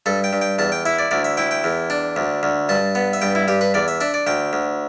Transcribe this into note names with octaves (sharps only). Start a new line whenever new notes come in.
G2 A4
G5
G2
G5
E2 A5
G5
E4 E5
D5
D2 D5
E5
E4 G5
G5
E2
D4
D2
D2
G2 A5
B3
E5
G2 G5
E4
G2 G4
B4
E2 D5
E5
D4 E5
D5
D2 G5
D2